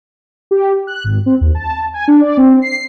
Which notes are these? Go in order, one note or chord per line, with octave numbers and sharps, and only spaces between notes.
G4
F#6
G#1
C4
D#2
A5
G#5
D4
D5
C4
C7